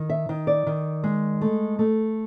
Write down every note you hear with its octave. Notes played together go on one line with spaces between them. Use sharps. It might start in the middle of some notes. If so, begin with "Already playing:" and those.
Already playing: D#3
E5
D#3
D5
D#3
G#3
A3
A3